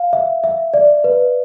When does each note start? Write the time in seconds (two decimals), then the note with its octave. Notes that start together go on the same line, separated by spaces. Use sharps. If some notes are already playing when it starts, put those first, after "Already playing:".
Already playing: F5
0.13 E5
0.44 E5
0.74 D5
1.04 B4